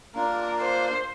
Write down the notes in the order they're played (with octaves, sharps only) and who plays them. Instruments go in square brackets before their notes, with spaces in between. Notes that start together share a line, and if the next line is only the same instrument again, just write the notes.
[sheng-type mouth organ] A#3 D4 F4 [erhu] A#4
[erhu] C5